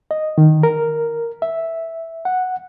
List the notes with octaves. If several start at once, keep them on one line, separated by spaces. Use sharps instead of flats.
D#5
D#3
A#4
E5
F#5